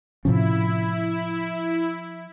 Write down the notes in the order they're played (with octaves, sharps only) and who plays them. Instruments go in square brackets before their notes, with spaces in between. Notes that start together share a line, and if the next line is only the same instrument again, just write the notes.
[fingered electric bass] A2 C3 C#4 [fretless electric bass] F3 [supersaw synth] E4